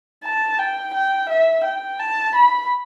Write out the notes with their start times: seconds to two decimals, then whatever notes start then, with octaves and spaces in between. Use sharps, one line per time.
0.24 A5
0.59 G5
0.94 G5
1.29 E5
1.65 G5
1.99 A5
2.35 B5